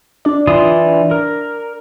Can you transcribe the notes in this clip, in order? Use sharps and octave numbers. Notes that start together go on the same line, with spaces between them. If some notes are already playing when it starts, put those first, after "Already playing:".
D4 D5
E3 F4 D#6
A#4